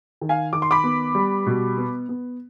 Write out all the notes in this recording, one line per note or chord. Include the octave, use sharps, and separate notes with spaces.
D#3
F5 G#5
D#3 D6
C6
B5 D6
B3
G3
B2
B3
B3